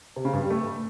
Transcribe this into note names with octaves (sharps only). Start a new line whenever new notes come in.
C3
C#3
G2
G3
A3